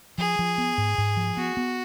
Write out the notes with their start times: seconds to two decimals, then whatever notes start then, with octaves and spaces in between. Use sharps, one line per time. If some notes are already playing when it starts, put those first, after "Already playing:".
0.18 F3 G#4
0.39 F3
0.58 B3
0.78 G#2
0.98 G#2
1.17 F3
1.37 B3 F#4
1.57 B3